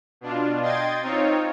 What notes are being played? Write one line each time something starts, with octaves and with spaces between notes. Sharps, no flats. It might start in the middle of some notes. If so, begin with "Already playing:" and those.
B2 D4 F4
D#5 G5 C6 G#6 A6
C4 D#4 F4 C#5